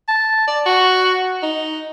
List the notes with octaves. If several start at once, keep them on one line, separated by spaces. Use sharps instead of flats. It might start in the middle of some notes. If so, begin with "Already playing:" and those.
A5
D5
F#4
D#4